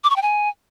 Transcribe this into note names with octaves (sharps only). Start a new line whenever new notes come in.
D6
C#6
G5
G#5